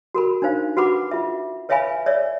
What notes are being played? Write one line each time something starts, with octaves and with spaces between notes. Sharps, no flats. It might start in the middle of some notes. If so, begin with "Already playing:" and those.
F#4 A#4 B5
D4 D#4 C5 F5
F#4 B4 F#5 B5 D6
F4 E5
B4 C#5 E5 F5 G#5 B5
C#5 D5 E5